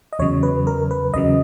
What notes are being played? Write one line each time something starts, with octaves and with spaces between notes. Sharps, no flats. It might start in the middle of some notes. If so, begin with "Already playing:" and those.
D#5
E2 C#3 F#3 C#5
B4
A#4
B4
E2 C#3 F#3 D#5